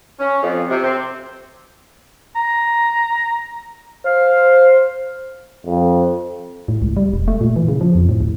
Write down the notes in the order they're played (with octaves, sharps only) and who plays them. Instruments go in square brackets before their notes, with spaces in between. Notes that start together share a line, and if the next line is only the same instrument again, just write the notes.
[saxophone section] C#4
F2
C3
C4
[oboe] A#5
[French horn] C5 [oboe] F5
[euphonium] F2
[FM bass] A2
C#2
G3
E1
A3
A#2
E3
C#3
F3
F2
A2
D2